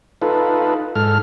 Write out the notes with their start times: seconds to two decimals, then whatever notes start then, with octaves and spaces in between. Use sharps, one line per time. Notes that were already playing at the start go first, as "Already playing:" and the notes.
0.22 D#4 F4 A4 B4
0.95 G#2 A4 F6